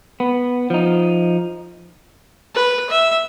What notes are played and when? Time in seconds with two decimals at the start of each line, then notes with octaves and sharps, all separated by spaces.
0.20 B3
0.70 F3 D#4
2.54 B4
2.90 E5